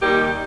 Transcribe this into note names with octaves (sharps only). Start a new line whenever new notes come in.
D#2 D#3 G3 D#4 G4